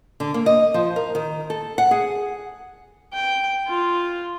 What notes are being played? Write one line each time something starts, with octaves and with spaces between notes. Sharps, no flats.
D3
A#3
D#5
F3
A#4
D#3
A4
F#5
G#4
G5
F4